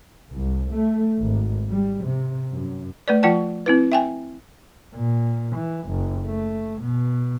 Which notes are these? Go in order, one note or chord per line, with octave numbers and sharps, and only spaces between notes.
C2
A3
G#1
G3
C3
F#2
A3 B4 D5
F3 F4 D5 F#5 G5 A5
C4 E4 B4
E5 G5 G#5
A#2
E3
F#1
A3
B2